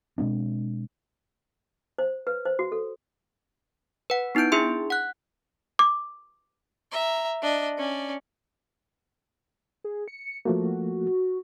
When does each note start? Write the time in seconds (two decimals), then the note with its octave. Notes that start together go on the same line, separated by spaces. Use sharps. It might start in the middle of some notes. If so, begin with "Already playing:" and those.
0.18 B2 G#3 C4 D4
1.98 C5
2.27 B4
2.45 C5
2.59 F#4
2.72 A4
4.10 B4 F#5
4.35 B3 D#4 E4 G6 D7
4.52 D4 E4 G#4 E5 C6
4.90 F#5 F#6
5.79 D6
6.92 E5 A#5
7.42 D4 D#5
7.78 C#4 D5
9.84 G#4
10.08 C#7
10.45 F3 A3 A#3 F#4